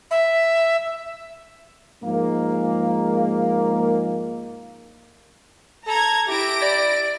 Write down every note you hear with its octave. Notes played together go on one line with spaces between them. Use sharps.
E5
G#2 F3 G#3 A#3
A4 A#5 G#6
E4 G4 A#6 D7
D5